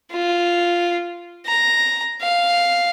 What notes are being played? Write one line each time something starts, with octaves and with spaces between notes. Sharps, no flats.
F4
A#5
F5